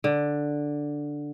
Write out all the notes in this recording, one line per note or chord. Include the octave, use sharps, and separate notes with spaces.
D3